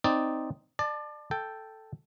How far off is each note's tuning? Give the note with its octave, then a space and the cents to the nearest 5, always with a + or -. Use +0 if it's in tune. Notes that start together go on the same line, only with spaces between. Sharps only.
C4 +0 D#4 +0 D5 +0
D5 +30 A5 +0
A4 +0 G5 +0